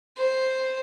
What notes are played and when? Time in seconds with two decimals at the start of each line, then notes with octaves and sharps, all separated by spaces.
0.17 C5